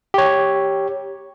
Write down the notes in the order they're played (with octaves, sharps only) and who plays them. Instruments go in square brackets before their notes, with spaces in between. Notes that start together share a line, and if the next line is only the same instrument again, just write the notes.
[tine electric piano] G4 C#5